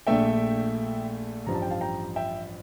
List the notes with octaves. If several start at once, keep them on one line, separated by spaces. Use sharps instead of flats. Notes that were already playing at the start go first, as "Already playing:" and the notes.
A#1 A#2 A3 D4 E5 G5
A1 G2 F3 A#5
A5
G5
F5 A5
G5 A#5
E5 G5